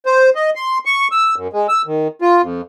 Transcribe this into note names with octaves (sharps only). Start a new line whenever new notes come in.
C5
D#5
C6
C#6
E6
F#2
G#3
E6
D#3
F4
F2